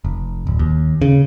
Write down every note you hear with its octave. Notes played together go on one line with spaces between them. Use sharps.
F1
D1
D#2
C#3